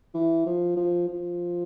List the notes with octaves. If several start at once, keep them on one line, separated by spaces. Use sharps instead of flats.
E3
F3
F3
F3